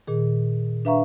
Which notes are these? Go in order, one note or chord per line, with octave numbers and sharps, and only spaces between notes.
A#2 D#3 G#4
D4 B4 E5 F5 A#5 C#6